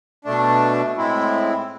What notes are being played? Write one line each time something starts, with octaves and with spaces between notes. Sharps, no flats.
B2 A3 D4
A2 G#3 C4 E4